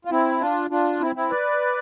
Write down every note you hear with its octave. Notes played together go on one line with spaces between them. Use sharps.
F4
C4 E4
D4 F4
D4 F4
C4 E4
C4 E4
B4 D5